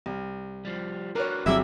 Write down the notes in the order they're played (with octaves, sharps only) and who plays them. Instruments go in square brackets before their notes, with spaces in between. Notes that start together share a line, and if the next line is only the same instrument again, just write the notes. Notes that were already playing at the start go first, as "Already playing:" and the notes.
[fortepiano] C2
[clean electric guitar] F3 G3
[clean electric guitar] D4 F#4 B4 [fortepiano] A#4 C#5
[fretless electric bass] G1 F#3 C4 [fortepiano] C2 G#4 D6 [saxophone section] E4 E5